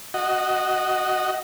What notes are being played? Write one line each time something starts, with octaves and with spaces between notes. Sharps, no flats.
F#4 D#5